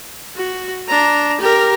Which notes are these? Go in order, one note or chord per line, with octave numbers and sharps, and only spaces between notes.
F#4
D4 A#5
G4 A#4